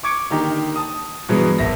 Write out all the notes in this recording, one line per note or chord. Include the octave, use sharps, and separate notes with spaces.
C#6 D6 G#6 C#7 D7
D3 D#3 A#3 D#4 G4
A5 D#6
G2 B2 E3 F#3 G#3 B3
G#1 E5 A#6